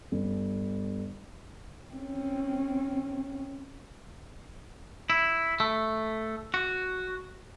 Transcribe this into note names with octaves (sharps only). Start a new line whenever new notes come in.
G1
C4 C#4
E4
A3
F#4